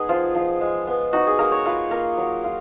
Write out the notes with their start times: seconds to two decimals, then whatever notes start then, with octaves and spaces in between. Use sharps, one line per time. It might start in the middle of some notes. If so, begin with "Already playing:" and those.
Already playing: B3 D#4 G#4
0.09 F3 F4
0.35 F3
0.61 G#3
0.87 B3
1.13 D#4 F#4
1.27 G#4
1.39 A#3 A#4
1.52 C#5
1.66 F4 B4
1.91 A#3 A#4
2.18 F#3
2.44 F4